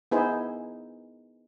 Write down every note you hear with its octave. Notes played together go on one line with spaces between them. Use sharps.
B3 D#4 E4 G#4 C5